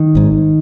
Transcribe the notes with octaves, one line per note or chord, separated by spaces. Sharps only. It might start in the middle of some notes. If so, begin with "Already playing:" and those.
Already playing: D#3
G#1 G#2